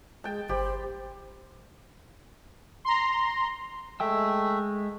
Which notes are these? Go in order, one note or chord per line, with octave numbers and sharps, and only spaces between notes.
G#3 G5 A5
G1 G4 C5 B5
A#5 C6
G#3 A3 E5 G5 E6